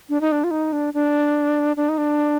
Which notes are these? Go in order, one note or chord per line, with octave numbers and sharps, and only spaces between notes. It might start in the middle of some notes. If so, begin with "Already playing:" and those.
D4
D#4
D4
F4
D#4
D4
D4
D4
D#4
D4